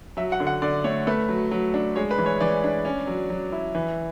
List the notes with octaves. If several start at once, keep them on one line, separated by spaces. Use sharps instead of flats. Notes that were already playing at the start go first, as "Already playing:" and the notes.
F#3 E5
F#5
D3
F#5
D3 D5
A3 C#5
A3 B4
F#3
F#3
D4
G#3 C#5
B4
E3
C#5
E3 D5
D4
C#4
F#3
F#3
E4
E3